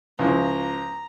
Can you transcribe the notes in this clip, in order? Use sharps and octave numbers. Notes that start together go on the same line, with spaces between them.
C#2 F3 E4 A#5